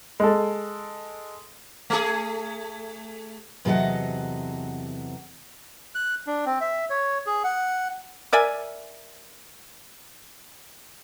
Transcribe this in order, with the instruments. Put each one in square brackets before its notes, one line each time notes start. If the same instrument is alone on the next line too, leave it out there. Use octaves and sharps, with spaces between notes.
[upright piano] G#3 A4
[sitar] A3 G#4
[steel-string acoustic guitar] E2 C3 F#3 A4 D#5 F#5
[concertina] F#6
D4
C4
E5
C#5
G#4
F#5
[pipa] A#4 D5 E5 G#5